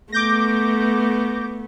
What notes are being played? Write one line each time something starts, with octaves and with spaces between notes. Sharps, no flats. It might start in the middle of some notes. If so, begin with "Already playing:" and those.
A3 B3 D6 G6 A#6